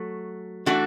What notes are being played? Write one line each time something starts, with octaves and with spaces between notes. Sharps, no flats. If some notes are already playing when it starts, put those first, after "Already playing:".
Already playing: F#3 A3
E3 A3 D4 F#4